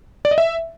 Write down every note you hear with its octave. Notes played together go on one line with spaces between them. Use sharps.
D5
D#5
E5